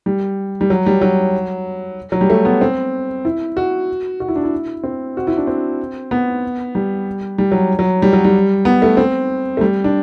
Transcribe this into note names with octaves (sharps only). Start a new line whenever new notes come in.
G3
G3
F#3
G3
F#3
F#3
G3
A3
B3
C4
E4
F#4
F#4
E4
D4
E4
C4
F#4
E4
D4
C4
B3
G3
G3
F#3
F#3
G3
F#3
G3
B3
A3
C4
A3
G3
D4